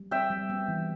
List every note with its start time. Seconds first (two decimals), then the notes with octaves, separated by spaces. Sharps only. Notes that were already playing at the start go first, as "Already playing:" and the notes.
Already playing: G3
0.11 C4 E5 G5
0.30 G3
0.50 B3
0.68 E3